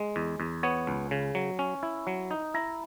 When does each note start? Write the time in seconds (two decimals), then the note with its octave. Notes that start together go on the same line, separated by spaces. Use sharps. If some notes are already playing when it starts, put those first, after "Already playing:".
Already playing: G#3
0.16 E2
0.40 E2
0.63 B3 C#5
0.87 C#2
1.11 C#3
1.35 F#3
1.59 C#4
1.83 E4
2.07 F#3
2.31 D#4
2.54 E4 A#5